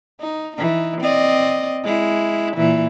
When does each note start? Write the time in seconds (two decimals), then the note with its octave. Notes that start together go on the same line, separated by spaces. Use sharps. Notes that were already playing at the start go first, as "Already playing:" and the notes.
0.20 D#4
0.57 E3 D#4
1.01 C4 D5 D#5
1.84 G#3 E4
2.57 A#2 E3